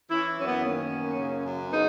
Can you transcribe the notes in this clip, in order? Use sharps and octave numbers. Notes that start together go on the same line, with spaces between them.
E3 C#4 E4
F#2 C#4
B3
D#3 A#3 C#4
F#2
C#3
F#2
C#3 B3 D#4